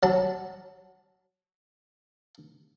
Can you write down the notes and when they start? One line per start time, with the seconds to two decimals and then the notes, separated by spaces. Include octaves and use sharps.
0.03 F#3 A5